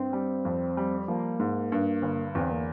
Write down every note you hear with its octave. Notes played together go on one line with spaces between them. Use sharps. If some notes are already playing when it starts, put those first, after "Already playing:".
Already playing: G2 C4
G3
F2
G3
F3 A#3
G#2
G2
G1
E2 C4
A#3